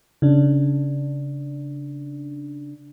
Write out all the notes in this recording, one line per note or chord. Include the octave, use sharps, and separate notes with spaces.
C#3 D4